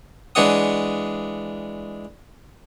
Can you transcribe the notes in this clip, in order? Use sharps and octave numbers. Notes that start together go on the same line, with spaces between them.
E3 G#3 D4 C#5 F#5 D#6